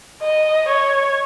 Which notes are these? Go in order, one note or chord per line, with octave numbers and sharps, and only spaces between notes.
D#5
C#5